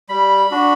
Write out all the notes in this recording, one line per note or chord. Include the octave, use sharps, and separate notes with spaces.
G3 B5
D4 F#4